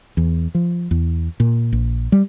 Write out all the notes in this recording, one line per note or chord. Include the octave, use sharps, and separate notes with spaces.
E2
F3
E2
A#2
A#1
G3